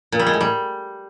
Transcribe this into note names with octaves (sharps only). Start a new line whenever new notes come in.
A#2
G3
G#3
A2
G3